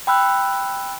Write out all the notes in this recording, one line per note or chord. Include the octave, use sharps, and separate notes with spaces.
G5 B5 E6 F#6